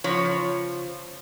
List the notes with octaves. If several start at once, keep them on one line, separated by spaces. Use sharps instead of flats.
C#3 F3 C#5